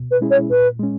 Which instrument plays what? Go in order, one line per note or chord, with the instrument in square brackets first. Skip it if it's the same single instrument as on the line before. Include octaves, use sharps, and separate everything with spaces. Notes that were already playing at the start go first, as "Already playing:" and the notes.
Already playing: [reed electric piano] B2
[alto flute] B4
[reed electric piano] G#3 C#4 E4 G#4
[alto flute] C#5
[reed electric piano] A#2 [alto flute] B4
[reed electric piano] G#3 C#4